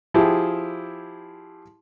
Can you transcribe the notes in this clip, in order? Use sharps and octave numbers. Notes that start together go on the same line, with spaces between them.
F3 E4 G4 G#4